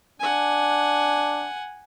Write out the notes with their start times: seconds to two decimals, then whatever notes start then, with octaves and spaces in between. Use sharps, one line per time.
0.20 D4 F#5 G#5